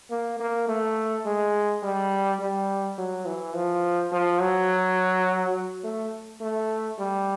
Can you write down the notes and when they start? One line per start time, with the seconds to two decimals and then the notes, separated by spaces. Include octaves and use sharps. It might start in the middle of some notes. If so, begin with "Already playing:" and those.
0.11 A#3
0.40 A#3
0.68 A3
1.26 G#3
1.83 G3
2.40 G3
2.98 F#3
3.26 E3
3.55 F3
4.12 F3
4.41 F#3
5.84 A3
6.41 A3
6.99 G3